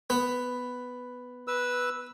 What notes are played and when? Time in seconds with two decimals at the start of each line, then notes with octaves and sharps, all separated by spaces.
0.10 B3
1.48 B4 E6